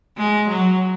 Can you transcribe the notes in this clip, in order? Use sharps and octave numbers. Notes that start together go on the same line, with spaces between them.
G#3
F#3